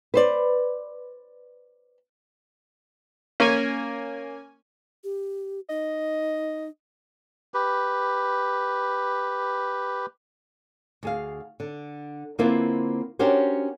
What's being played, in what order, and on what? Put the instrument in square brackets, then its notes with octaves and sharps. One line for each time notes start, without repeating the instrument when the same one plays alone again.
[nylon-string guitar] B4 C5 D5
[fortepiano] A#3 [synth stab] C#4 G#5
[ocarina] G4
[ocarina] D#4 [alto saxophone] D#5
[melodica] G4 B4
[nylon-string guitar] D2 G#4 F5
D3
D3 A#3 C4 E4 F4 B4
C#4 D4 F#4 G4 A#4 C5